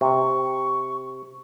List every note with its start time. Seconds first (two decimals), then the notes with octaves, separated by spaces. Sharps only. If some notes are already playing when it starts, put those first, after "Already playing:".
0.01 C3 C#6